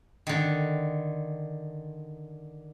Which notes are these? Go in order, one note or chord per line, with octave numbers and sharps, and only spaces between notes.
D3 D#3